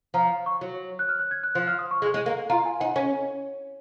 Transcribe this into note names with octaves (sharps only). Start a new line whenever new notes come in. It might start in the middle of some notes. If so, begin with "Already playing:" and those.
F3 A#5
C#6
F#3
F#6
F6
F#6
G#6
F#6
F3 F#6
F6
D#6
C#6
G#3
G#3
A#3
F4 A#5
G#5
D#4 F#5
C#4 G#5